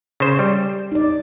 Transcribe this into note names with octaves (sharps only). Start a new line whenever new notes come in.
C#3 C5
G3
D#4 D5